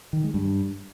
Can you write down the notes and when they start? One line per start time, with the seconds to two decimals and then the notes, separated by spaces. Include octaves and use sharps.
0.13 D#3
0.24 G#3
0.34 G2